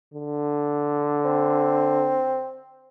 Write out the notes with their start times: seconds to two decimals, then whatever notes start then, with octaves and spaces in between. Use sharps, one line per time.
0.14 D3
1.25 C4